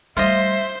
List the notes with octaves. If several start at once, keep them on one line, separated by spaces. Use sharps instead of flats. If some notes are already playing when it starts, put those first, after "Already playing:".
G3 A3 F4 C5 D#5 E5